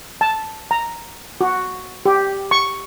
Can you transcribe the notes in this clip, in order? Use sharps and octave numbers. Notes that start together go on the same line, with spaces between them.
A5
A#5
F#4
G4
C#6